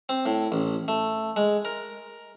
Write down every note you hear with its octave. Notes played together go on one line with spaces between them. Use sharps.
C4
A2
A1
A3
G#3
A#4